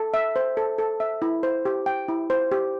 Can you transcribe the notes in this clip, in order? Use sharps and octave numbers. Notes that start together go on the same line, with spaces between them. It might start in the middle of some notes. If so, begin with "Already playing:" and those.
Already playing: A4
E5
C5
A4
A4
E5
E4
C5
G4
G5
E4
C5
G4